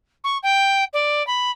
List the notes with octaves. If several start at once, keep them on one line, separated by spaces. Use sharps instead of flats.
C#6
G5
D5
B5